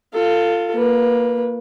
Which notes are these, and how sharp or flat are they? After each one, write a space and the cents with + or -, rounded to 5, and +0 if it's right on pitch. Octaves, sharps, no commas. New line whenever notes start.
F4 +0 A4 +25
A#3 +0 B4 -20